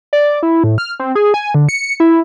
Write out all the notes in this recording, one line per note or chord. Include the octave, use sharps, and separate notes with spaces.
D5
E4
A2
F6
C4
G#4
G#5
D3
C#7
E4